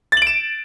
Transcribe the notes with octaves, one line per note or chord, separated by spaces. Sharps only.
A6 D7 E7 F#7